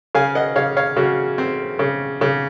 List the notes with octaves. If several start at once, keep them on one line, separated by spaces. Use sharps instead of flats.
C#3 F5 G#5
D#5 F#5
C#3 C#5 F5
C#5 F5
C#3 F#4
C4
C#3
C#3